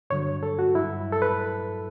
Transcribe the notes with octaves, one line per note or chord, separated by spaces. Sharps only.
G2 D3 F#3 C#5
A4
F#4
G2 F#3 E4
A4
B4